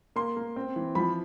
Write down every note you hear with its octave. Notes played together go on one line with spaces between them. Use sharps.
A#3 C6
A#3
C4
E3
F3 B5